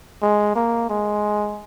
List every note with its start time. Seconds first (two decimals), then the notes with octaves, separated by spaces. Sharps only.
0.22 G#3
0.55 A#3
0.90 G#3